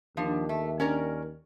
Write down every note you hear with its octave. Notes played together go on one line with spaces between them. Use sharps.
D#2 F3 D4
A3
C#4 A#4 D5